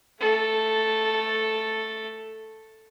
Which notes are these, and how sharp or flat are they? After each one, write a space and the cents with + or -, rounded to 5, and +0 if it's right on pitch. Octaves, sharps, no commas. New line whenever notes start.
A3 +0 A4 +0